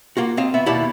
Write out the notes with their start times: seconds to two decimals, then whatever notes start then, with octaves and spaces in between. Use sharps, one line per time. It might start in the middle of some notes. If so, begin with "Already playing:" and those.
0.17 A#3 F4 F#4
0.37 C4 D#5 F5
0.54 C#2 B3 E5 B5
0.66 D#2 B2 E4 D5 B5